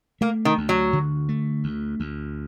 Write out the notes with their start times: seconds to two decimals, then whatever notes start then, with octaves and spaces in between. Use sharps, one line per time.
0.21 A3 A#3
0.45 D#3
0.58 D2
0.69 F#3
0.93 D3
1.29 A3
1.64 D2
2.00 D2